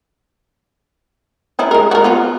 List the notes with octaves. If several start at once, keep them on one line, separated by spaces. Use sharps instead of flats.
C#4 D#4 E4
G#3 A#4
F#4 A#4
B3 F4 F#4